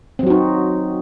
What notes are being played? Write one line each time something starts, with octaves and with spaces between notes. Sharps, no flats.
F#3 C4 D#4 F#4